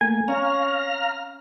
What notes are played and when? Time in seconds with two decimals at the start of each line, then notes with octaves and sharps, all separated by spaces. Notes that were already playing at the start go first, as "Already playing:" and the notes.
0.01 A3 A#3 G#5
0.28 C#4 F5 A#5 F6